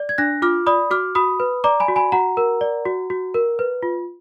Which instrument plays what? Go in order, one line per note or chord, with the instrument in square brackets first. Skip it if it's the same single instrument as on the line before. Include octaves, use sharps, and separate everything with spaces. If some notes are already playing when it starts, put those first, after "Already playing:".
Already playing: [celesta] D5
G#6
D4 F#6 A#6
F4 D6 F6
D5 B5 D#6
F#4 D6 F6
F#4 B5 D#6
B4
D5 A#5 D6
G#5 B5
F#4
G#5 B5
F#4 F#5 A#5
A#4
D5
F#4
F#4
A#4
B4
F4